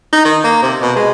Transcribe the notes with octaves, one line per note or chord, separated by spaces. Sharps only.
D#4
D#3
A#3
C3
B2
G#3